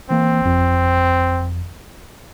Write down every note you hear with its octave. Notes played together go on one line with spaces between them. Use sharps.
E3 A#3 C4
G1 F2